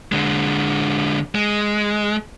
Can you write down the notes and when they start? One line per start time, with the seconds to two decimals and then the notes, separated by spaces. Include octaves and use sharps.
0.12 D3 G#3
1.35 G#3